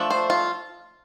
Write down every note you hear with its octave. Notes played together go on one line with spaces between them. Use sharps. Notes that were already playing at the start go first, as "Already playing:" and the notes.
Already playing: F3 A3 D4
C5
F4